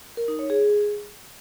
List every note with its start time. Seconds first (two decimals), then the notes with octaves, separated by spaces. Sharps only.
0.17 A#4
0.28 D#4
0.39 C#5
0.50 G#4